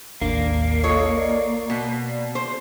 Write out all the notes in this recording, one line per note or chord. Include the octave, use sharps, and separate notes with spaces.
A1 D#2 A#3 D4
F4 A4 C#5 D#5
D5
B2
C5